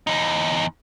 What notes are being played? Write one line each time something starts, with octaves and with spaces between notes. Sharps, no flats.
E2 D#4